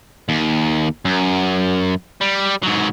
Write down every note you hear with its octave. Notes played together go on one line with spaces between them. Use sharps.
D#2
F#2
G3
G#2 F#3